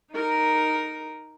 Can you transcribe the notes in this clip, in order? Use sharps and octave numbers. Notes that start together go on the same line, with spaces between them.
D#4 A#4